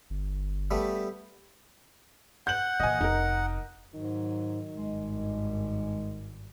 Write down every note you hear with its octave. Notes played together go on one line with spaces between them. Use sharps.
G1
G3 A3 B3
F#5 G6 F#7
A#2 E3 D#5 G#5
F1 D#4 A#4
G#2 D#3 F#3
G#1 G2 G#3